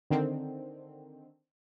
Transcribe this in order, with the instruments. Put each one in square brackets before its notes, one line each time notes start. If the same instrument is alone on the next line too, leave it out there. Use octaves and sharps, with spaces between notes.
[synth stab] D3 D#3 C4